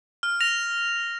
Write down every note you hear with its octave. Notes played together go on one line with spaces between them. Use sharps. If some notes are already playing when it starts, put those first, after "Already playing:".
F6
A#6 F7